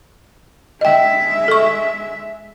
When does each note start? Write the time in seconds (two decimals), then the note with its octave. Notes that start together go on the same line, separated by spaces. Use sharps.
0.81 G#3 D#5 E5 G5
1.48 A4 C#6